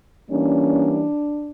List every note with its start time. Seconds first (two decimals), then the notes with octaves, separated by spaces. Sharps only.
0.30 E3 G3 A#3 C#4 D4